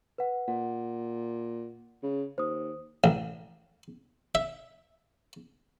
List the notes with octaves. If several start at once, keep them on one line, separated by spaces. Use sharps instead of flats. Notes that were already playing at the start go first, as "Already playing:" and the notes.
B4 F#5
A#2 F#5
C#3
D#2 C5 D#6
A1
E5